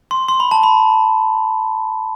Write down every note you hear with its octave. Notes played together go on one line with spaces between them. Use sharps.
C6
C6
B5
A5
B5